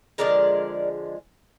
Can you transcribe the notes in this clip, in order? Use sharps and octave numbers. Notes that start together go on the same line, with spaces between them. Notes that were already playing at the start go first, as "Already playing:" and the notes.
D3 F3 G#3 A#4 D5